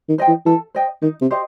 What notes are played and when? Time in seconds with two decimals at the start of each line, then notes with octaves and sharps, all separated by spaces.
0.09 D#3
0.18 C5 D#5 G5
0.28 E3
0.46 E3 A4
0.75 C5 D#5 G5
1.02 D#3 D#4
1.21 C3
1.31 G4 C5 D#5